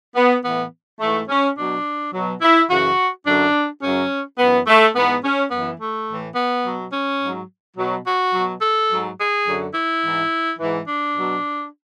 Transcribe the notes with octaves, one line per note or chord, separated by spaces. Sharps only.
B3
A2 E3 B3
G#2 E3 A3
C#4
B2 F#3 D4
B2 F#3
E4
F#2 C#3 E3 F#4
F#2 D3 F#3 D4
F#2 C#3 F#3 C#4
F#2 E3 B3
A3
G#2 E3 B3
C#4
F#2 E3 B3
A3
A2 E3
B3
B2 F#3
C#4
G#2 F#3
B2 F#3
F#4
B2 F#3
A4
G#2 F#3
G#4
F#2 D3 F#3
E4
G#2 E3
G#2 E3
D4
B2 F#3